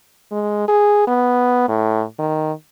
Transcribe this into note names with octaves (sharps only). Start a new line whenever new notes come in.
G#3
G#4
B3
A2
D#3